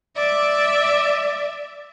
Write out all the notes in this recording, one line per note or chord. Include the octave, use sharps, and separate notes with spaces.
D5 E5